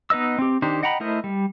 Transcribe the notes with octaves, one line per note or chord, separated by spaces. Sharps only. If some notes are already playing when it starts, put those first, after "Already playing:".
B3 D#4 B4 D#5 E6
C4 G4
D#3 D4 D#4 G4 C5
D#5 F#5 G5 A#5 B5
A3 E4 A#4 C5 D#5
G3